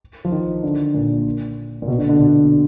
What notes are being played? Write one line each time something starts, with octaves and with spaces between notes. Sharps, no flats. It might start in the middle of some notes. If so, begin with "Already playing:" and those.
F3
D#3
D3
A#2
A#2
B2
D3
D3
B2